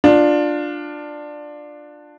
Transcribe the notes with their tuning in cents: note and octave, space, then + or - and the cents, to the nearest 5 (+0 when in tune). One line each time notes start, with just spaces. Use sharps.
D4 +10 F4 +15